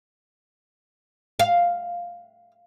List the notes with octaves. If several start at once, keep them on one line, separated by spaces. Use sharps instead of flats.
F5